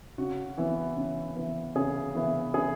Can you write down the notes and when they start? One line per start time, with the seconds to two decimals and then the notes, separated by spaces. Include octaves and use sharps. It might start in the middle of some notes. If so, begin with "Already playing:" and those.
0.18 C#3 F#4
0.58 E3 B3 E4
0.96 C#3
1.36 E3 B3 E4
1.76 C#3 G#4
2.15 E3 B3 E4
2.54 C#3 G#4